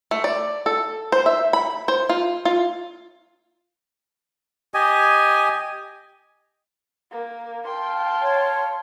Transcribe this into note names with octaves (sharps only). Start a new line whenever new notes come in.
A3
D5
A4
C5
E5
B5
C5
F4
F4
G4 D#5 G#5
A#3
F5 G5 A5 C6
C#5